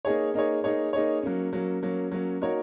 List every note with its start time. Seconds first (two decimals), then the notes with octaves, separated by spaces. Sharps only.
0.05 A#3 D#4 G#4 C#5
0.34 A#3 D#4 G#4 C#5
0.64 A#3 D#4 G#4 C#5
0.93 A#3 D#4 G#4 C#5
1.22 F#3 A#3 C#4
1.53 F#3 A#3 C#4
1.83 F#3 A#3 C#4
2.11 F#3 A#3 C#4
2.42 A#3 D#4 F#4 A#4 C#5